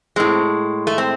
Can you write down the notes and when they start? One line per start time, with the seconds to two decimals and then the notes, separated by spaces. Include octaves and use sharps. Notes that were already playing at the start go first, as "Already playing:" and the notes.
0.16 A2 G#3 C4
0.87 A3
0.98 C4